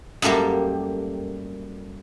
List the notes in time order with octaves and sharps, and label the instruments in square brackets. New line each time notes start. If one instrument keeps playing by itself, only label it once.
[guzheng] F#2 G3 A3 A#3 G4